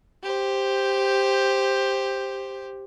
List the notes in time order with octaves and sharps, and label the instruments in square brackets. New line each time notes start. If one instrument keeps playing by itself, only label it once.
[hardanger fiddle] G4 C5